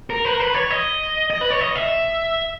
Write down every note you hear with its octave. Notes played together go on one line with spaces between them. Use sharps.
A#4
B4
A#4
B4
C#5
D#5
D#5
B4
C#5
D#5
E5